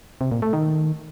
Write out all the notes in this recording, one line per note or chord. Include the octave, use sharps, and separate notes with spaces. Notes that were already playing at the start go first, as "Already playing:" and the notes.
C3
A#2
A3
D#3